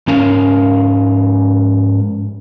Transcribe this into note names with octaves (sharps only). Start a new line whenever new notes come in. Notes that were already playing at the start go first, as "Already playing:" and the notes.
G#2 C#4 A#4 F5